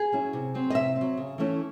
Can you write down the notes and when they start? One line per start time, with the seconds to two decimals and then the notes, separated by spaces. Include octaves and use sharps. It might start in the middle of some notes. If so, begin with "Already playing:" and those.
Already playing: G#4
0.12 F#3 C#4 E4
0.33 C3
0.54 F#3 C4
0.70 D#5
0.75 C3 E5
0.96 C4
1.01 F#3
1.17 C#3
1.38 E3 A3 C#4 E4